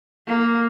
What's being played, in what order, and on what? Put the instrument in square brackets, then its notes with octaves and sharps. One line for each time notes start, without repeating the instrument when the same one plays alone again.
[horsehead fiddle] A#3